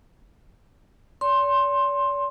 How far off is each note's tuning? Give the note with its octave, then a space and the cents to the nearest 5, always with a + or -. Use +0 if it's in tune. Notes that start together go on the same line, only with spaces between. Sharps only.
D5 -45 C6 +15